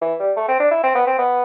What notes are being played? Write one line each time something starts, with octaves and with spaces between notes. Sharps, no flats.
E3
G3
A3
C4
D4
E4
C4
B3
C4
B3